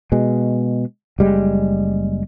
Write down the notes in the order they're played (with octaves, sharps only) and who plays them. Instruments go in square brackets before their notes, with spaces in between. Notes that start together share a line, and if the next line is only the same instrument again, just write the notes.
[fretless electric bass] B2 G#3
F#1 G3 G#3